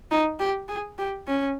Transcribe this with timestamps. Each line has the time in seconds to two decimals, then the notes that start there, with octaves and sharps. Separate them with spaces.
0.11 D#4
0.40 G4
0.69 G#4
0.98 G4
1.27 C#4